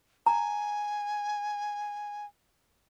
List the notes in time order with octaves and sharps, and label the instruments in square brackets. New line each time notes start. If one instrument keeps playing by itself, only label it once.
[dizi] G#5 [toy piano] A#5